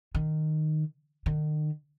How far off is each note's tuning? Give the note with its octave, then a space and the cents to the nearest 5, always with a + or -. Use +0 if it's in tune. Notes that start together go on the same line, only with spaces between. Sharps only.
D#3 -10
D#3 -40